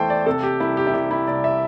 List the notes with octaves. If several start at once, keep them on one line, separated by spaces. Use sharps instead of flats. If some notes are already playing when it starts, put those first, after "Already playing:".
Already playing: E2 E3 A3 C5 G5 A5
D5
C3 A4
G4
C2 E4
G4
E4
C2 G4
E4
C2 D5
E5